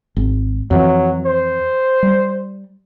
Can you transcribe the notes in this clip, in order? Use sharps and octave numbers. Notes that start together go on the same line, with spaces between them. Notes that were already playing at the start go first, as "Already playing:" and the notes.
G#1
F2 E3 F#3
C5
G3